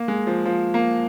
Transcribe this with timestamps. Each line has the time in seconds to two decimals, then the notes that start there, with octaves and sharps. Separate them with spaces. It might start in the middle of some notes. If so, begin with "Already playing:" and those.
Already playing: A#3
0.08 G#3
0.27 F3
0.45 F3
0.74 A#3